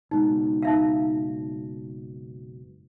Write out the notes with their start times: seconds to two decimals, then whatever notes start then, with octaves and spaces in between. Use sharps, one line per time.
0.11 F#1 B2 G#3 D#4
0.63 D#4 E5 F5